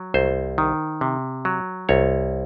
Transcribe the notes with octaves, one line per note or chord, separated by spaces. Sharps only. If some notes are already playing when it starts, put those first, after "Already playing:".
Already playing: F#3
C2 C5
D#3
C3
F#3
C2 C#5